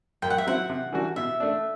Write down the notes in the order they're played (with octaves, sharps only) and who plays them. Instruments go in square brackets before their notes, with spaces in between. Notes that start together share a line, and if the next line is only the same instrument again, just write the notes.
[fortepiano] F#2 [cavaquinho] G5
[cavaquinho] F#5
E5
[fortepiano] F#3 C4 E4 [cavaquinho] F#5
[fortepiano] C3
E3 G3 D4 F#4
[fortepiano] B2 [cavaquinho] E5
[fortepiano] A3 D4